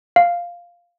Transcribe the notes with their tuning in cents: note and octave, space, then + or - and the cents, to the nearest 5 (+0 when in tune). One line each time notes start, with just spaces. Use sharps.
F5 +0